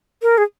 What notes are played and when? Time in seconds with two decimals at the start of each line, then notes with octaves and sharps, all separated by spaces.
0.22 A#4
0.38 G#4